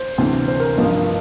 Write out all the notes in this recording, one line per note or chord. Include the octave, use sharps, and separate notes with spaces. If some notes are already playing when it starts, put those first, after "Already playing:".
Already playing: C5
D2 C3 E3
C5
A#4
A1 G2 F3
A#4